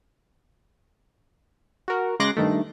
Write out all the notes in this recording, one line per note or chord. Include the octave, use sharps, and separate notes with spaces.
F#4 A#4
C#3 G#3 C6 D6 F#6 A#6
G2 D#3 A3